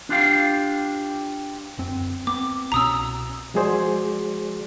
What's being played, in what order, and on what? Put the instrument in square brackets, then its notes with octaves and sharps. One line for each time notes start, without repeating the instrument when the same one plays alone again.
[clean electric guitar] D4 F4 G4 F5
[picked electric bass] D1 F#2 C4
[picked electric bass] B3 C4 [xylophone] D6
[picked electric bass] C2 B2 C#4 [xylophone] A#5 D#6 E6
[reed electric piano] F3 G#3 F#4 G#4 C5 D5